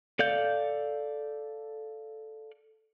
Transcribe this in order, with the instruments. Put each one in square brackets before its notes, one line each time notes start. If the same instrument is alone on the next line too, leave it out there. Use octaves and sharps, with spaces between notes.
[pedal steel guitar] A4 D5 F5 G6